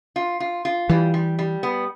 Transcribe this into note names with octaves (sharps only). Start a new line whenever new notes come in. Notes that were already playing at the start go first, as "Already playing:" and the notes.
F4
F4
F4
E3 G3
G3
G3
B3